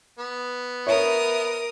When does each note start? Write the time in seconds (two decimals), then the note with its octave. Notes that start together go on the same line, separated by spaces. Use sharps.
0.19 B3
0.87 A#4 C#5 E5 D#6